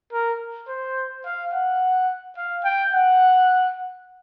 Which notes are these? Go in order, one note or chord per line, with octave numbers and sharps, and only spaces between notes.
A#4
C5
F5
F#5
F5
G5
F#5